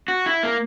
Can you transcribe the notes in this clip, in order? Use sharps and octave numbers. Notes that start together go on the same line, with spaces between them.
F#4
E4
A#3